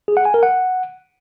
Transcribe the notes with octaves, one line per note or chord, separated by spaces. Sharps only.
G#4
F#5
G#5
A#4
F#5